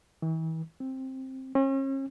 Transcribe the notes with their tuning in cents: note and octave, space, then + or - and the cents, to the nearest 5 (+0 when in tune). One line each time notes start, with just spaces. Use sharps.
E3 -40
C4 +10
C#4 -40